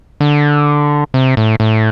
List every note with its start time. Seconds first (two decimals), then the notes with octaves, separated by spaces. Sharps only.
0.21 D3
1.14 C3
1.37 A2
1.60 A2